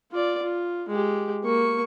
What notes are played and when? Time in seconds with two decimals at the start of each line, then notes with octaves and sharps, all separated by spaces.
0.12 F4 D5
0.42 F4
0.89 G#3 G4
1.44 A#3 C#6